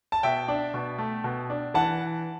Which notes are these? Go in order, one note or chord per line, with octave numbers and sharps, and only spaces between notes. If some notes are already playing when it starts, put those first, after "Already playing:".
A5
B2 E5 G5
D4
B2
A3
B2
D4
E3 F#5 A5